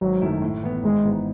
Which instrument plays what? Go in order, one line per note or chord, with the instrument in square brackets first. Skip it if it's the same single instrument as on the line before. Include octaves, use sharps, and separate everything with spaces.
[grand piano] G#1 [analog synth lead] F#3
[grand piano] F#2 D#3 A3 E4
A2
E3 B3
[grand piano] G#1 [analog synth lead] G#3
[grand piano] G#2 E3 B3 D#4